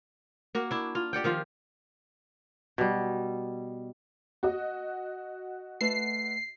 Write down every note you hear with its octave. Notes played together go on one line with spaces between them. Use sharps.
A#3 F#4
D4 E4
F4
G4 D5 F#5 G5
D#3 F3 F4
B2 G3
F#4 D#5
A3 B4 A5 C7